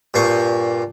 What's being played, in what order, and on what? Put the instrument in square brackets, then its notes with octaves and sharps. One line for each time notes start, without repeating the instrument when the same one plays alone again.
[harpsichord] G2 A#2 C5 C#6